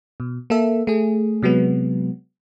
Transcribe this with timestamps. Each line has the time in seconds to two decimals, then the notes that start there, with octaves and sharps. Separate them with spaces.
0.20 B2
0.50 A#3 A4 E5
0.87 A3 G#4
1.43 C3 F#3 G#3 B3